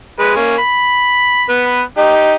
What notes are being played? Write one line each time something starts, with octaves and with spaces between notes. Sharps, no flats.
G#3 B4
A#3 C#4
B5
B3 B4
D#4 G4